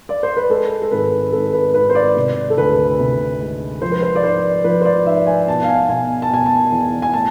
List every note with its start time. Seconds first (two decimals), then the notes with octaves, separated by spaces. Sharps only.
0.09 D5
0.23 C5
0.37 B4
0.50 G#3 A4
0.82 A4
0.91 G#1 B4
1.33 G#1 A4
1.53 B4
1.74 G#1 B4
1.89 C5
1.95 D5
2.16 C3
2.50 A4
2.57 D2 B4
2.99 C3
3.40 G#3
3.82 F3 C5
3.92 B4
4.02 C5
4.16 D5
4.23 G#2 C5
4.64 F3 B4
4.81 C5
4.85 D5
5.06 G#2 E5
5.26 G#5
5.48 B2 A5
5.63 F5
5.68 G#5
5.89 B2 G#5
6.22 A5
6.30 B2 G#5
6.46 A5
6.72 E2
7.02 G#5
7.14 A2 A5